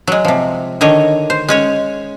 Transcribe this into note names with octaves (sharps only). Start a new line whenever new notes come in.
F#3 G#3
C3 F3
D3 D#3 C#5 D#5
C5
G#3 C#4 C#5